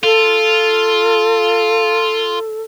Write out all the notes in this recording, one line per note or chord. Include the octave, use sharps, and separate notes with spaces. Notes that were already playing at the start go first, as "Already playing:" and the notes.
F4 A4